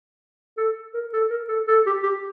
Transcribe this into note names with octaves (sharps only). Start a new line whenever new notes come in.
A4
A#4
A4
A#4
A4
A4
G4
G4